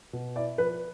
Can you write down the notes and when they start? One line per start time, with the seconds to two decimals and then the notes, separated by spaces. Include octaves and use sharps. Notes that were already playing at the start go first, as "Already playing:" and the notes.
0.13 B2
0.36 E4 D5
0.58 F3 B4